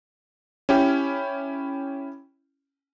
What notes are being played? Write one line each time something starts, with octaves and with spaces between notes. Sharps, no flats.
C#4 E4 G4